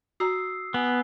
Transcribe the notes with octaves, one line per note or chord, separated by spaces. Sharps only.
F#4 A#5 D#6 E6 C7
B3 G#5 G7